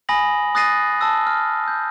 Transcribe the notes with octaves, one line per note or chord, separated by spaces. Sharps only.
G#5 B5 D#6 A#6 F#7
D#6 F#6 A6 A#6 C7 D#7
A5 E6
F6
G6